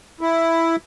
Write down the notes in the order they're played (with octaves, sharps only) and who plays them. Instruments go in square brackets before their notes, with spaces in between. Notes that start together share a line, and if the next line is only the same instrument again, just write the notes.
[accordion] E4